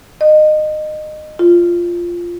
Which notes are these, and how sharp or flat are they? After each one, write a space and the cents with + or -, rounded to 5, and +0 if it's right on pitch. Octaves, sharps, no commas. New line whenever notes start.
D#5 -25
F4 -5